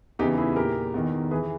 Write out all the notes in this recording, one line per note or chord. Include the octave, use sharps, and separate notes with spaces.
E2 C#3 E3 D#4 G4
E4 G#4
A#2 G4 A#4
E2 D#3
E3 G#4 B4